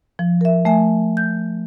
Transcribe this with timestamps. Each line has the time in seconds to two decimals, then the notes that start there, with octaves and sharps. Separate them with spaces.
0.19 F3
0.41 A#4 E5
0.65 A3 E5 G#5
1.17 G6